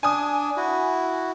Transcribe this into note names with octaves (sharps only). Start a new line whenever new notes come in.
D4 G#5 D#6
E4 F#4